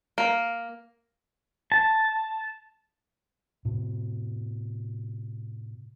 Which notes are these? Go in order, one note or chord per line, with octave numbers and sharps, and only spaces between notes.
A#3
A5
A2 C3